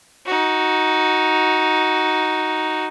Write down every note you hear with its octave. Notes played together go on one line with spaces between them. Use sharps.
D#4 F#4